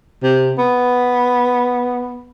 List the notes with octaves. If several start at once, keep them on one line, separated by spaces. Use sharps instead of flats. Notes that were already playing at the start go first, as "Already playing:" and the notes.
C3
B3